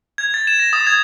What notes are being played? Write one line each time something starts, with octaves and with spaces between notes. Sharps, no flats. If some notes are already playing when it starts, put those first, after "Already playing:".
G#6
A6
E7
A#6
D#6
G#6